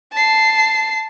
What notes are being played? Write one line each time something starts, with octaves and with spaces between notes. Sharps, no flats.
A5 C7